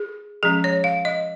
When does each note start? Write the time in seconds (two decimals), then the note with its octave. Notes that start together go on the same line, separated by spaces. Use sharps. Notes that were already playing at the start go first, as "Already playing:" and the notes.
Already playing: G#4
0.43 F3 G#3 C#4 G#4
0.64 C#5
0.84 F5
1.05 D#5